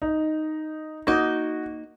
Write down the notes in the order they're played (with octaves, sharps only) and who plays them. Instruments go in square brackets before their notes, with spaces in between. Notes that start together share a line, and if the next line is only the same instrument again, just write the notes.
[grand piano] D#4
[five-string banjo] A#3 D#4 [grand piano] F#4